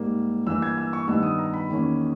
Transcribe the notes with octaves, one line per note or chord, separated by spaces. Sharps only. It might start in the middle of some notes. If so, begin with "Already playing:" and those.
Already playing: G#2 G3 A#3
G2 E3 A#3 E6
G#6
E6
C#6
G2 D#3 G3 B3 D#4 E6
D#6
A#5
B5
E2 D#3 A#3 C#4